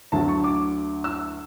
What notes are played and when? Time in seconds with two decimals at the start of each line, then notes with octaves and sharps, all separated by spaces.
0.12 D2 D3 F#3 A5
0.28 C#6
0.44 D6
1.04 E6